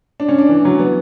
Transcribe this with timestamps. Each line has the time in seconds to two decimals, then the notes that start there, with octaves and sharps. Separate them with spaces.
0.20 D4
0.29 C#4
0.38 D4
0.49 E3
0.65 F#3
0.79 B3